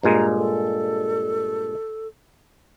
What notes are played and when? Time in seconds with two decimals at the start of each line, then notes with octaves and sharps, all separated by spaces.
0.03 G2 A#2 G#3 A#5
0.36 A4